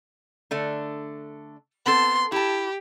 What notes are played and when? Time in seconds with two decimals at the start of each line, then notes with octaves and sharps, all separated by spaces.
0.51 D3 A3 D4
1.86 B3 C4 A4 C6
2.32 E4 G4 A5